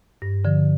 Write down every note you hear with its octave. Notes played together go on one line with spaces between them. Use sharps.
G2
D3 F3